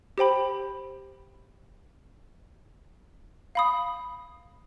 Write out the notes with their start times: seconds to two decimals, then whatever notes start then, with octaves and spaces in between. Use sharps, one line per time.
0.18 G4 C5 G5 B5
3.55 F5 B5 D#6